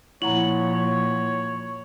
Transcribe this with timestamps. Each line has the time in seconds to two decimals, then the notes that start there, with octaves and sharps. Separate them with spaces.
0.22 A#2 F3 E4 C#5 F#5 A#5 F#7
0.75 C#5